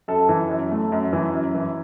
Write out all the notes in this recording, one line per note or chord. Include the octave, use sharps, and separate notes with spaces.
F#2 A4
E3
F#2
A3
F#2
E3
F#2
E3